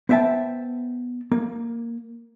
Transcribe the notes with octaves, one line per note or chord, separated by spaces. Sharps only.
B3 C5 E5 G5 A5
A#3